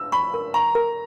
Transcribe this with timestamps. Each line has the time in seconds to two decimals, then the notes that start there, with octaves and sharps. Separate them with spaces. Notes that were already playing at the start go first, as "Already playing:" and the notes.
Already playing: E6
0.12 B5 C#6
0.34 A#4
0.54 A#5 C#6
0.75 A#4